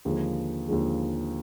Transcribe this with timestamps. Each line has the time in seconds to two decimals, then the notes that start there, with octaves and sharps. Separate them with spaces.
0.05 D#2 D3 F3 G#3
0.68 D#2 D3 F3 G#3